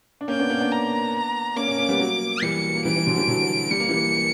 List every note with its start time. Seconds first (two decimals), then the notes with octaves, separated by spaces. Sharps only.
0.21 D4
0.28 A#3 C#4 G5
0.39 B3 D4
0.50 A#3 C#4
0.61 B3 D4
0.72 A#5
1.56 A#3 C#4 D6
1.68 A#3 C#4
1.78 A#3 C#4
1.89 G3 B3
1.99 F#3 A#3
2.42 E3 G3 C#7
2.75 A#3
2.85 E3 G3 D7
2.96 E3
3.07 D3 F#3
3.17 E3 G3
3.28 D3 F#3
3.71 G3 C#7
3.80 A#3
3.89 E3 G3